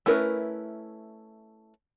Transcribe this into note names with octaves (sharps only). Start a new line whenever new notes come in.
A3 C#4 E4 A#4 B4